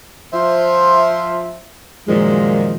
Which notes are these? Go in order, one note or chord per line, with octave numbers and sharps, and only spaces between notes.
F3 F4 C5 E5
F#2 A#2 D#3 F3 G#3